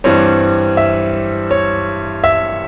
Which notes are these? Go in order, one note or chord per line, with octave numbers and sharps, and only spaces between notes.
G2 E3 G3 C4 C#5
E5
C#5
E5